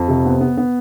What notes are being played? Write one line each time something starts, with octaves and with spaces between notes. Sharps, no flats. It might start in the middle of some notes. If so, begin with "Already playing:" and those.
Already playing: F2
C3
B3
B3
B3